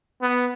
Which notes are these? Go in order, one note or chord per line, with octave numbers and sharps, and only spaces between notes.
B3